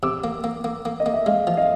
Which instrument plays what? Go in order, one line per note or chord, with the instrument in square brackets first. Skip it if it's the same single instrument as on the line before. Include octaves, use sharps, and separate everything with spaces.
[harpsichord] C3 [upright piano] D6 E6
[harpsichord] A#3
A#3
A#3
A#3
[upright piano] D#5
[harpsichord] A#3
[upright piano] E5
[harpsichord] G#3 [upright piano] D#5 F5
[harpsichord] F3
[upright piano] D#5 F5